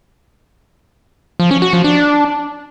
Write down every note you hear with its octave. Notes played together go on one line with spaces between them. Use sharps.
F3
C#4
F#4
F3
D4